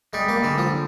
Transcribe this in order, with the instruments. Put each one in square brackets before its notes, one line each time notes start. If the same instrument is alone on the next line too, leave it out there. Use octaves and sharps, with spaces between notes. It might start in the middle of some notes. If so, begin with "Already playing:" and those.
[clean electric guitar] G3 [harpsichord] G#3
[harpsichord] A#3
[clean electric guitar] D3 [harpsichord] G#3
[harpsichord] F3